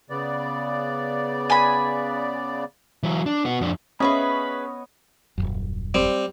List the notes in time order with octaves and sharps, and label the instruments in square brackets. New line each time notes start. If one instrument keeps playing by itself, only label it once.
[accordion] C#3 B3 D5
[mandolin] G#5 B5
[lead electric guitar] E3 F#3
D4
B3 F#4
F2 D4
[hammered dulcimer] B3 C#5 D#5 [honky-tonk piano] C#4 [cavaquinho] G#4 B4 E5 [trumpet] B5
[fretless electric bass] D#1 G#1 F#2
[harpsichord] G3 C4